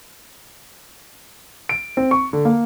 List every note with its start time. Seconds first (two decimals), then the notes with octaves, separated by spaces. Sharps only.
1.69 D7
1.97 C4
2.11 C#6
2.33 D3
2.45 A#3